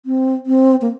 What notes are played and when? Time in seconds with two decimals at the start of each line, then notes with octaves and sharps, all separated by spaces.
0.06 C4
0.46 C4
0.82 A#3